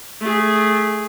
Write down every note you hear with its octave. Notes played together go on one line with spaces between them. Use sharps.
A3 G#4